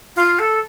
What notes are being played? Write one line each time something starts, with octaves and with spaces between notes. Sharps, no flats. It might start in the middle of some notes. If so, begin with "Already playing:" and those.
F4
A4